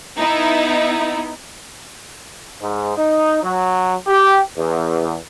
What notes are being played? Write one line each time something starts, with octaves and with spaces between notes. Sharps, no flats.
B3 D#4 E4
G#2
D#4
F#3
G4
E2